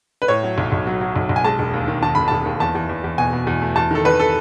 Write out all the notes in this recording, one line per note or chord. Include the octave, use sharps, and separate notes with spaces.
B4
A2 C#5
F#3
B1
B1
F#3
F#3
B1
B1
G#5
G#3 A5
E1
D#2
D#3
D#3 A5
E1 B5
E1 A5
D#2
E2 A5
E2
E2
E2
B2 G#5
B2
E2
A3
E2 A5
D#3 A4
E2 B4
A4